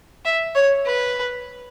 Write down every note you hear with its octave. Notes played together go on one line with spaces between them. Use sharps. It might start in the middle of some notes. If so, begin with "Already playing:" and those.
E5
C#5
B4